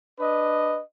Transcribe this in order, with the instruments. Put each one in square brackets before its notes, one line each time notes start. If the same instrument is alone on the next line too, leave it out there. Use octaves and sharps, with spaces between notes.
[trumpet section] D4 B4 D#5